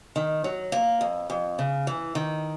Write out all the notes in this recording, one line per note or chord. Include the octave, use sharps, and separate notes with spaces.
D#3
F#3
A#3
F2
F2
C#3
E3
D#3